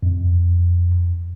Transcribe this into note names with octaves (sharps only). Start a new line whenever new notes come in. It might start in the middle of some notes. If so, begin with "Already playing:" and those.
F2